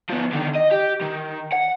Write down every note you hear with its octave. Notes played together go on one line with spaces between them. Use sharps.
F3 B3
D3 D#3
D#5
G4
D#3
F#5